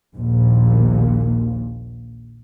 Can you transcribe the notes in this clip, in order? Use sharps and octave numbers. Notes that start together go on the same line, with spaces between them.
A#1 D#2 A#2